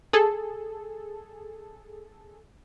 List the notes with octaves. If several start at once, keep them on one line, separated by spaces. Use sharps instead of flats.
G#4 A4